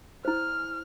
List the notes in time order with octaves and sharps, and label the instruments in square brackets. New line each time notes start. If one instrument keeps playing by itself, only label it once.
[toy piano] E4 C5 [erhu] F6